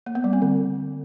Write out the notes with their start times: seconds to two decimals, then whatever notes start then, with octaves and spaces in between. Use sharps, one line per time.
0.06 A#3
0.15 B3
0.24 G3
0.33 C4
0.42 D3